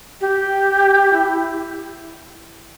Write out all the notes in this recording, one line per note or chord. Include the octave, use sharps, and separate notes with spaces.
G4
E4